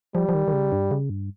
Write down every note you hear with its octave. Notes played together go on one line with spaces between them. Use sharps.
F3 G3
F3
D#3
D#3
C#3
G2
C#3
G2